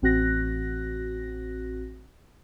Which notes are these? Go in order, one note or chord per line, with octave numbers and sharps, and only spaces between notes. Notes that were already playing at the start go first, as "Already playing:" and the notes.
A1 C4 F#4 F#6 A#6